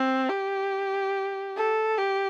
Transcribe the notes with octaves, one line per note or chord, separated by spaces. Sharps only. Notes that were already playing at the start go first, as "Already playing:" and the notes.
Already playing: C4
G4
A4
G4